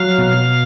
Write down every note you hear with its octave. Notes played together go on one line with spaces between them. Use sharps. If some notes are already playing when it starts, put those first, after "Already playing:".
Already playing: F#3 F5
B2